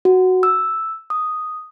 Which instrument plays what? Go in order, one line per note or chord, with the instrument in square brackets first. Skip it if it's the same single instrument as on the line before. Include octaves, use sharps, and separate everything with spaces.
[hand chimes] F#4
E6
D#6